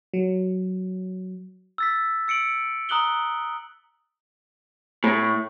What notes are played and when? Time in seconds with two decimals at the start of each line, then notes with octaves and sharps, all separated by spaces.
0.14 F#3
1.78 E6 A6 B6
2.28 E6 C#7 D7 F#7
2.89 A#5 D#6 F#6 F#7 G7
5.04 A2